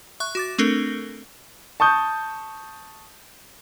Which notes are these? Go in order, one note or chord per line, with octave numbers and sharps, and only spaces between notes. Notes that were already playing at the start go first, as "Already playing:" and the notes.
E5 C#6 F#6
F#4 D6 A6
A3 C4 D4 A4 A#4
A5 C#6 D#6 G6